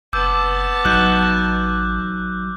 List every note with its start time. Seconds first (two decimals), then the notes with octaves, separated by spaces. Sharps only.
0.13 F#1 B3 A5 D6 E6 G6
0.85 A1 F#3 D#4 F#6 G6